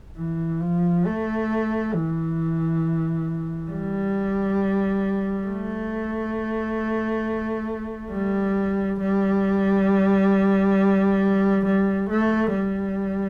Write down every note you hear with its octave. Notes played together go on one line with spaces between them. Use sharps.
E3
F3
A3
E3
G3
A3
G3
G3
G3
A3
G3